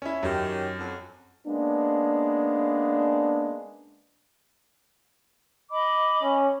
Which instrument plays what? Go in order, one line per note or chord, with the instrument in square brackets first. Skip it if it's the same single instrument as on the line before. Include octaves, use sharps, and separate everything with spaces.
[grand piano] C#4 E4
[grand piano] F#2 [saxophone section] D#3 C#4 G4
[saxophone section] F2 F#3
[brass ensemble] G#3 A#3 B3 C#4 D4
[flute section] D#5 B5 D6
[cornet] C#4